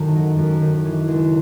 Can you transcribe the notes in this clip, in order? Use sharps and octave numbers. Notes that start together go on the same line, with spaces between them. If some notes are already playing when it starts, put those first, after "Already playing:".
Already playing: F#2 D#3 A4
F#3
F#2
D#3
E3
C#2